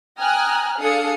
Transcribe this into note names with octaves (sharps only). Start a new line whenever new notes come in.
G5 G#5 A#5 D#6 F6 F#6
D4 G#4 A4 F5 D#6 C#7